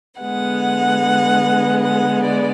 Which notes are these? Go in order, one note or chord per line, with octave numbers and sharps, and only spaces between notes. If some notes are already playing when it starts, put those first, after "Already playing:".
D3 G#3 B3 F#5
F#5
D5